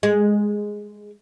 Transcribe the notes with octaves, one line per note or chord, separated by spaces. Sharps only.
G#3